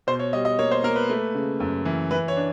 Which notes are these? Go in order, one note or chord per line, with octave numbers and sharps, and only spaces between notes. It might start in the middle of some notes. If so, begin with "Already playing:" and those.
B2 C5
C#5
G3 D#5
D#5
A#3 C#5
C5
A#3 A#4
B4
A3
C#3
F#2
E3
E3 B4
C#5
D4